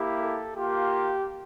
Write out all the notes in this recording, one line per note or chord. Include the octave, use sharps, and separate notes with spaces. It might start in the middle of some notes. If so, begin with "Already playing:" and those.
Already playing: A#3 E4 G4
A4
A#3 F4 G4